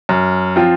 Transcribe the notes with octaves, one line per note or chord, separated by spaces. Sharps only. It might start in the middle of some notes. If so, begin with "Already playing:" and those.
F#2
F3 C4 F4